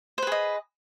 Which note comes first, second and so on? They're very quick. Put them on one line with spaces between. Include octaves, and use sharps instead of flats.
C5 B4 G#4 D#5